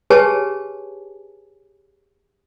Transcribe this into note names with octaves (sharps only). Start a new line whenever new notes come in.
G4 G#4 B4 C#5 G#5 A5